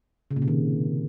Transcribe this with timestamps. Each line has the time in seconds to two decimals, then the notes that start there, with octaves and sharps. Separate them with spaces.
0.31 C#3
0.36 A#2
0.42 C3
0.48 D#3